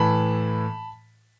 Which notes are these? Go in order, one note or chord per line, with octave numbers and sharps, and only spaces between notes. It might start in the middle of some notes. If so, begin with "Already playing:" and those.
Already playing: A2 E3 A5 B5